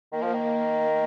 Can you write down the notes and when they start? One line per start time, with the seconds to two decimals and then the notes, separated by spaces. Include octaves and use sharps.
0.11 D#3 A#3
0.22 F3
0.34 D#3